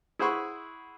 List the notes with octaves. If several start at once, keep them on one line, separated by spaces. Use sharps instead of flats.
E4 G#4 C5 F#5 B5 C#6